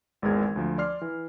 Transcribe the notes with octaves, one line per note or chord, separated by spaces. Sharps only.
G#1 E2 G#3 A#4 G#6
D2 F3
D5 C6 F6 C7
E3